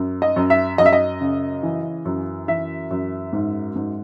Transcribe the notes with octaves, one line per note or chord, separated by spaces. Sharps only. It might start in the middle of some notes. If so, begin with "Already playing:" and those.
Already playing: F#2
D#5
F#2
E5
F#2 D#5
E5
D#5
C#3
E3
F#2
E3 E5
F#2
G#2
G#2